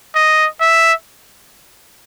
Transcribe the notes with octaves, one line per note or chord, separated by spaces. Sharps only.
D#5
E5